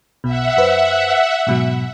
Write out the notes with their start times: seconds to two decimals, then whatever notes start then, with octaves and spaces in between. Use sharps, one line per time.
0.24 B1 B2 E5 F#5
0.57 F#2 B4 C5
1.47 G#2 B2 F#3